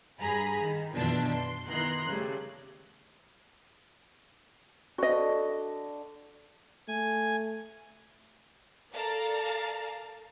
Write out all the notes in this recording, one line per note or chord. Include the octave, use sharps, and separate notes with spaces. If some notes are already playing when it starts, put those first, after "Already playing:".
G2 G#4 G#5 A#5 B5
D#3
F#2 B2 D#3 E3 D4 F4
C6
D#3 B3 E4 A#5 C6 F#6
C#3 G3 A3
D3 F#4 D#5
A3 G#5
A4 A#4 D5 F5 A5 A#5